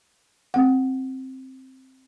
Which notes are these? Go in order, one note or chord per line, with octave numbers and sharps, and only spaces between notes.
C4 F#5